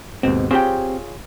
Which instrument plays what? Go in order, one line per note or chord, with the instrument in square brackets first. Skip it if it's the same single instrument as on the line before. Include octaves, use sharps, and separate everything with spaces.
[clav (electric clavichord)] D#2 G#2 B2 [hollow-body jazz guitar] C4
[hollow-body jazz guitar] C4 G4 G5 [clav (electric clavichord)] F4 G#4 C#5